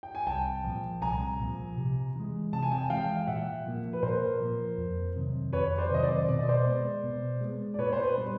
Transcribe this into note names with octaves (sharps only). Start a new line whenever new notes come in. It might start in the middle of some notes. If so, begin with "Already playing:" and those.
G5
G#5
C2 G5 A5
A#2 F3
C2 G#5 A#5
A#2 F3
C3
E3 G#3
C3 A5
G#5
G5 A5
E3 G#3 F5 G5
F5
A#2 E5 F#5
F3 A#3
B4
A#2 A#4 C5
F3 A#3
F2
C3 D#3 F#3
F2 B4 C#5
C5 D5
C3 D#3 F#3 D#5
C5 D5
B2 D5
D#5
C5 D5
G#3 B3
B2
G#3 B3
D5
A#2 B4 C#5
C5
B4
G3 B3 D4